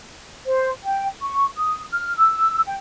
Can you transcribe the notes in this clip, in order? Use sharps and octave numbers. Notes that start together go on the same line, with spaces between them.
C5
G5
C#6
D#6
F6
E6
G5